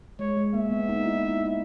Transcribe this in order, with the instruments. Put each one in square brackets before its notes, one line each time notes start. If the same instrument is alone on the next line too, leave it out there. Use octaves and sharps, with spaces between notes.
[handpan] G#3 [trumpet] C#5
[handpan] G#3
[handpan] A#3 [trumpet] E5
[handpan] B3
D#4
E4
D#4
D#4